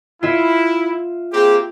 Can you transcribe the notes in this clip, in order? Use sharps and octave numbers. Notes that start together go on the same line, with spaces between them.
E4 F4 E5
A#3 C4 G4 G#4